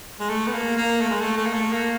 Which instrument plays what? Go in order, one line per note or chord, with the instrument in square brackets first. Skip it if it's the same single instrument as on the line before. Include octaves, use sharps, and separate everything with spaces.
[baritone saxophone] G#3
A3
B3
A#3
A#3
A3
G#3
A3
A3
A#3
A3
A#3